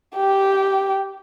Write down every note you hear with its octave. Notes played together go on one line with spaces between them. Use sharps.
G4 G5